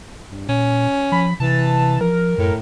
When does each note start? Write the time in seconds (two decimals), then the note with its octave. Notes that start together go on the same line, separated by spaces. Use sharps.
0.29 G2
0.49 A#2 C#4
1.12 F3 B5
1.40 C3 E3 A5
2.01 F3 A#4
2.38 F#2 A2